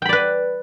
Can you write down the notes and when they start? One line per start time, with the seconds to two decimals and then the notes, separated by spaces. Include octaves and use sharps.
0.02 G5
0.05 B5
0.09 D5
0.13 B4